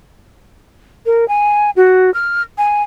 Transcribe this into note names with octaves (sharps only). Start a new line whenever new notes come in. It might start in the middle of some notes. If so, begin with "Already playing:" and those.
A#4
G#5
F#4
F6
G#5